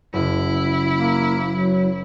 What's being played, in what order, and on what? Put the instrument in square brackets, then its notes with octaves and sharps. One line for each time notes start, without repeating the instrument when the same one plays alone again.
[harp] F#1 [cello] E4
[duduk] A#3
F#3